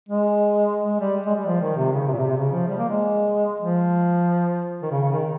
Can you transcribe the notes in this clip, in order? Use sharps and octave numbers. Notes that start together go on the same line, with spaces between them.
G#3
G#3
G3
G#3
G3
F3
D#3
C3
C#3
C3
A#2
C3
C3
C#3
F3
G3
A#3
G#3
F3
D#3
C#3
C#3
D#3